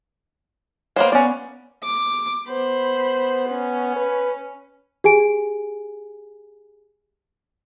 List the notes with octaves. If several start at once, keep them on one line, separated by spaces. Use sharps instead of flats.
A#3 B3 C5 C#5
B3 C#4 D5
D6
B3 C5 B5
C#4
B4
G4 G#4 G#5 D7